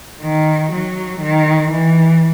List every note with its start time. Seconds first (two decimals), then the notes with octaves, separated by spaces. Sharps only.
0.22 D#3
0.72 F#3
1.21 D#3
1.71 E3